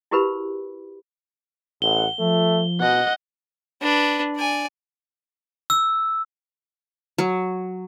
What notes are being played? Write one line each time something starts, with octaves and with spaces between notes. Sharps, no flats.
E4 F#4 G4 A#4 B4 B5
A1 F#5 G7
F3 A3
B2 D#5 F#5
D4 B4
D5 G#5
E6
F#3